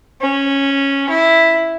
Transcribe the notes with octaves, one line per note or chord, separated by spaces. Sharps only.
C#4
E4